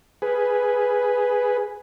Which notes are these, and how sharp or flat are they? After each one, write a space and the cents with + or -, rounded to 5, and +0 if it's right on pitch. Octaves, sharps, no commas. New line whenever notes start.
G#4 +0 B4 +0